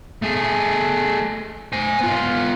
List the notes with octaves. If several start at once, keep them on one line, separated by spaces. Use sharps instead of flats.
A3 G#4
C5 G#5
B3 F4